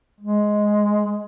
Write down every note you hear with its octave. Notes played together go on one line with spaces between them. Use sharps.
G#3